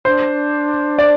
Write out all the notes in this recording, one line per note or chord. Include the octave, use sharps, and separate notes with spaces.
D4 C5
D5